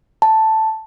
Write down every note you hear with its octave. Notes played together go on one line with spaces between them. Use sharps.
A5